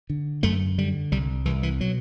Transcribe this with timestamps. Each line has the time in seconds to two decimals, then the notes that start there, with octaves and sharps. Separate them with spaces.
0.10 D3
0.43 F#2 A3
0.78 D3 G3
1.12 C2 G3
1.45 C2 E3
1.63 E3
1.80 B2 F#3